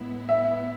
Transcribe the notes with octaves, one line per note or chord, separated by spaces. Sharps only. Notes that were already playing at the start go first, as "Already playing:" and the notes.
Already playing: A2 G#3 B3 E4
E5